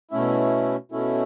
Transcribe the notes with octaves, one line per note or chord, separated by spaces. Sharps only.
B2 A3 C#4 E4
B2 A3 C#4 E4